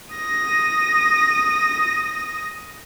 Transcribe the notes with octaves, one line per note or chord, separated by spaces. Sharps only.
D#6 A#6